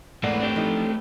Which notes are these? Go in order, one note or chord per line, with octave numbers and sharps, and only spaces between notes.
E2 G#2 A3 A#3 C4 B4 D5 F#5
C4 D4 G4
F3 D#4 A4